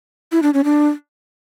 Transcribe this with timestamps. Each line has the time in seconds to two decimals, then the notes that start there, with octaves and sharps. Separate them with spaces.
0.32 E4
0.43 D4
0.54 C#4
0.64 D4